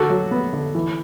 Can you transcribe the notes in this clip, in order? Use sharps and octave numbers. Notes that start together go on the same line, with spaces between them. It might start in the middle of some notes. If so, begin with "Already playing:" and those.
Already playing: D3 F#4 A4
F#3
B3
D3
E3